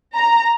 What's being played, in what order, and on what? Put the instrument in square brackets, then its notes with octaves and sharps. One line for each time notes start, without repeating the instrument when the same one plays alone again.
[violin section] A#5